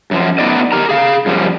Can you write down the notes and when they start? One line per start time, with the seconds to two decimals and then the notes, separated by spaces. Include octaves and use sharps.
0.11 F#2 F3
0.38 F#3 A3 B3 D#4 D5 D#5
0.72 G4 A#4 A#5
0.89 G#4 F5
1.26 F#2 F3 G3